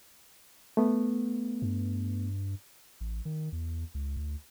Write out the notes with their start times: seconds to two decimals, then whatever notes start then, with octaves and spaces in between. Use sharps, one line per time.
0.77 A3 B3
1.62 G2
3.01 A1
3.25 D#3
3.52 E2
3.95 C#2
4.17 D2